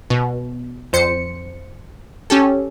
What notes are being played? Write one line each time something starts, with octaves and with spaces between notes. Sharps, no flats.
B2
F2 C5 C#7
C#4 G4 A4